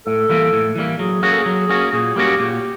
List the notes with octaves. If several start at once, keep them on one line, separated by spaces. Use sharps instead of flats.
A2 A4
E3 G3 A#3
A2
E3 G3 A#3
F#3 G#4
A#3 C#4 F#4 G#4
A4
G#4
F#3
A#3 C#4 F#4
A#2 G#4
G3 A#3 C#4 F#4 G4
A#2 G4